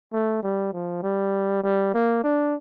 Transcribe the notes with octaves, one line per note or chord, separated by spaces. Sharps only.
A3
G3
F3
G3
G3
A#3
D4